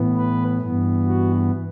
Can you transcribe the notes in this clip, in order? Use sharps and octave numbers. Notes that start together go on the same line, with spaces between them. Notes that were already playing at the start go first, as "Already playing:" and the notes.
Already playing: A2 E3 B3
B4
G2 E3 B3
F#4